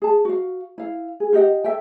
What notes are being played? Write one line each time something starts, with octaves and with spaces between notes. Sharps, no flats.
G#4 A5
F#4 F5
E4 F5
G#4
F4 G4 D#5 F#5
A4 E5 G5